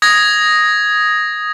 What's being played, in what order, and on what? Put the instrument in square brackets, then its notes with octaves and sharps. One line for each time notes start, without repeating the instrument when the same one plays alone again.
[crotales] D#6 G#6 A#6